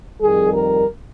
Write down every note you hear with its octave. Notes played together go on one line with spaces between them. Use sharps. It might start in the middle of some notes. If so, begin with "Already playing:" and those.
F2 D#3 G3 G#4
A#4